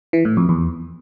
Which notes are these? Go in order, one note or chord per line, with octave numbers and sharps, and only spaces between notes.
E3
A2
F2
E2